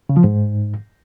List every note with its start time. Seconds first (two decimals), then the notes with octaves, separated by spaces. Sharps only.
0.09 C#3
0.17 F3
0.24 G#2